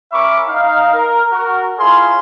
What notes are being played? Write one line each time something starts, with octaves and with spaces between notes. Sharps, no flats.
C#4 A#4 E5 B5 C#6 D6
D#4 F5
A#4
F#4 A#4
E4 F4 G#4 A#4 C#5 C6